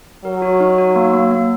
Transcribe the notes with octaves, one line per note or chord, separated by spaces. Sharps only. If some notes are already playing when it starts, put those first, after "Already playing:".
F#3 A#4
F#4
D#4
F#4
A#3
A#3
A#3